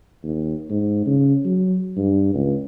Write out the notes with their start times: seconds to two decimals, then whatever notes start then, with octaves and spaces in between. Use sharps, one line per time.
0.24 D#2
0.70 G#2
1.06 C#3
1.45 F#3
1.97 G2
2.34 C#2